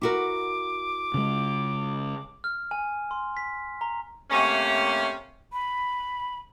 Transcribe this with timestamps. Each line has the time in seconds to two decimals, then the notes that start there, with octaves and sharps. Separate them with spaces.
0.02 E4 F#4 A#4 D6
1.14 C#3 G#3
2.44 F6
2.71 G#5
3.11 C6
3.37 B6
3.81 A#5
4.30 C3 A3 A#3 C#4
5.53 B5